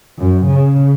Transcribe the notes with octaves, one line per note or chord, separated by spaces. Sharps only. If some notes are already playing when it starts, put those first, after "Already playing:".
F#2
C#3